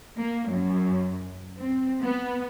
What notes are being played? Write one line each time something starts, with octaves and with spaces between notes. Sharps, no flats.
A#3
F#2
C4
B3